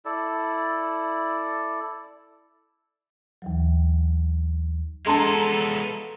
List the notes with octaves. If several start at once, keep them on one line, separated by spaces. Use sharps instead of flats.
E4 A4 D5
D#2 E3 F#3
G#3 B3 A4 A5 A#5 C6